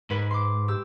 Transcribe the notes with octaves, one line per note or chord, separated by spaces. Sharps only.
G#2 B4 G#5
C6 D6
G4 E6